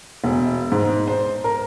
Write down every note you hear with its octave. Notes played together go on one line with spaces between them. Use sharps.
E1
G#2
C5
A#4